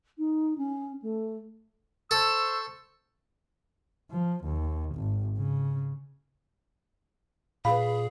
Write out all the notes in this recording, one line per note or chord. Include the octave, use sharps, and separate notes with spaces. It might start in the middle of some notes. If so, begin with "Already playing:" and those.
D#4
C#4
A3
A4 C5 C#6 E6
F3
D#2
G#1
C#3
A#2 G#4 B4 F5 B5